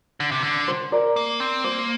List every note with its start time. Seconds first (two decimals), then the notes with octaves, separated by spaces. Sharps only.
0.20 D3
0.31 C3
0.43 D3
0.68 C5
0.92 A#4 D5
1.16 A#3
1.40 C4
1.64 A#3 C5